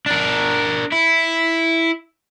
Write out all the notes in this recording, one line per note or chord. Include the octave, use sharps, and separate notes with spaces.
D4 A#4
E4